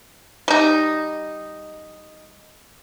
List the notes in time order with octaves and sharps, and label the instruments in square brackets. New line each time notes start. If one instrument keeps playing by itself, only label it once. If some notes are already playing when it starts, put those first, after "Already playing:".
[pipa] G3 D#4